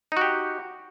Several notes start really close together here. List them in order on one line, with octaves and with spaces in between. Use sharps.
D#4 F#4 G4